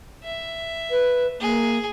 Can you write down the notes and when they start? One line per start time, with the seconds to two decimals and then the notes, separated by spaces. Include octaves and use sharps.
0.23 E5
0.91 B4
1.40 A#3 G#4